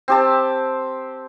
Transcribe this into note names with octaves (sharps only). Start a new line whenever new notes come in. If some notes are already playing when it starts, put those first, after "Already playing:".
C4 G4 A5